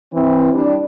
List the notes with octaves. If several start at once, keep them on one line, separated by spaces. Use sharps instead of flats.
E3 C4
G3 D4